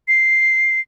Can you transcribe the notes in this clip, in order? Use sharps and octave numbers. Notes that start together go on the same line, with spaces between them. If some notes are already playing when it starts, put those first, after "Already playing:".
C7